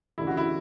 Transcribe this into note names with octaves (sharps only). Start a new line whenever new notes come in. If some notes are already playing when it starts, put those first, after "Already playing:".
E1 D2 C#3 E4
F#4
E4